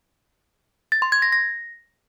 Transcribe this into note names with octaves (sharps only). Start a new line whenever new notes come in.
A6
C6
G#6
A#6
A#6